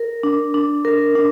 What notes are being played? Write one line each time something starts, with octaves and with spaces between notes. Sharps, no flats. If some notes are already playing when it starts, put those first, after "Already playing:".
Already playing: A#4
D4
D4
A#4
D4